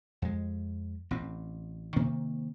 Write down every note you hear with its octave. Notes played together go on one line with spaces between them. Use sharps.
F2 G#3
A1 C4
C3 D#3 A#3 C4